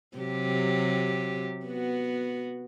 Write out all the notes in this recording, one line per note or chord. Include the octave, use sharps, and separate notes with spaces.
C3 F#3 G4
B3 F#4